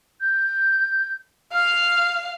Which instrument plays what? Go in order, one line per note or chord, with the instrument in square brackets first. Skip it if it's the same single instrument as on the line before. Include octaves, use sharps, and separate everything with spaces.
[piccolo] G6
[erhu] F5 [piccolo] F6